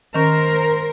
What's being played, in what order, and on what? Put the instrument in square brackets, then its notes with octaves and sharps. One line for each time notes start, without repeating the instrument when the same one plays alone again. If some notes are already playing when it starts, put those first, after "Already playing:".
[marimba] D#3 C#4 [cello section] A#4 C5